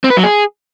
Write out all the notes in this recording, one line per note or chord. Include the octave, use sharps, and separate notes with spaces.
C4
B4
F#3
G#4